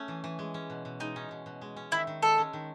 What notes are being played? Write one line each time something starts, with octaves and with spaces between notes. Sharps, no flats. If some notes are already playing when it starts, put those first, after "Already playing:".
Already playing: A3 C#4
E3
E3
G#3
C#4
B2
B2
G#3 D#4
C#4
B2
B2
G#3
C#4
D#3 E4
D#3
G#3 A4
C#4
D#3